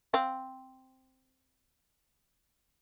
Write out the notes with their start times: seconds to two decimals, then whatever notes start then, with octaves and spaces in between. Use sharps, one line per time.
0.14 C4 F5